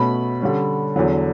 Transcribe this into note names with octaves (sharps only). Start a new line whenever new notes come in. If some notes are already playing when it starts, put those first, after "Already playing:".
Already playing: B2 A3 C#4 B5
D3 G3 C#4
E2 D3 F#3